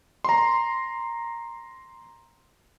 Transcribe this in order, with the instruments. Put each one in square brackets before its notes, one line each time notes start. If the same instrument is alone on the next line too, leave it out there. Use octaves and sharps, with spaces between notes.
[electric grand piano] A#5 C6